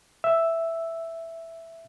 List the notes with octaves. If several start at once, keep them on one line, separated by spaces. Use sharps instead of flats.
E5 E6